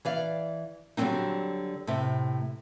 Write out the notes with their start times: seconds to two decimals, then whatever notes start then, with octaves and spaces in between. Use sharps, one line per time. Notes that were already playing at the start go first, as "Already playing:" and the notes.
0.05 E3 D5 F5
0.97 D3 F#3 G3 A3 C4 D#4
1.87 A2 C3